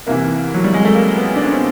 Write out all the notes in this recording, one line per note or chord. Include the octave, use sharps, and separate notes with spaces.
C2 C3 E3 A#3
F#3
G3
G#3
A3
A#3
B3
D4
C#4
C4